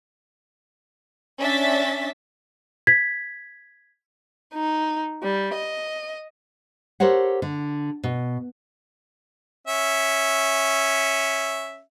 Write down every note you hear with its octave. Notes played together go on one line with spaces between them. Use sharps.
C#4 D4 E5 A6 B6
G#6 B6
D#4
G3
D#5
G4 A4 A#4 C5 C#5 F#5
D3
B2
C#4 E5